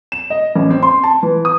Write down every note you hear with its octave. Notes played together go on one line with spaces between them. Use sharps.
E7
D#5
A1
C4
C6
A5
E3
D#6